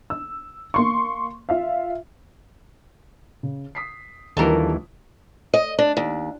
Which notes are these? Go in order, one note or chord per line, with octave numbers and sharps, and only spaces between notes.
E6
A#3 C6 C#6
F4 E5 F5
C#3
D#6 B6 C7
D#2 E3 F3 G3 D4 A4 A#4
D#5
D4
D#2